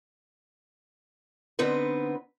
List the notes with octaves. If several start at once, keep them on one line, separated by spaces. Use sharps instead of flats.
D3 B3 C4 D#4 B4